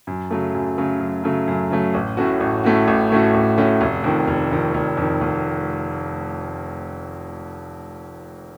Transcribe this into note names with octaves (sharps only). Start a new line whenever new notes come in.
F#2
C#3 F#3 A3
F#2
C#3 F#3 A3
F#2
C#3 F#3 A3
F#2
C#3 F#3 A3
A1
A2 A3 C#4 F#4
A1
A2 A3 C#4 F#4
A1
A2 A3 C#4 F#4
A1
A2 A3 C#4 F#4
F1
F2 D#3
F1
F2 D#3
F1
F2 D#3
F1